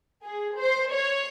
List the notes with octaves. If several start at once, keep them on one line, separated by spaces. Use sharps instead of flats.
G#4
C5
C#5